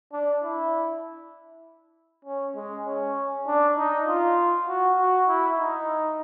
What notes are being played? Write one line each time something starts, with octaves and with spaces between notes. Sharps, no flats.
D4
E4
C#4
G#3
C#4
D4
D#4
F4
F#4
F#4
E4
D#4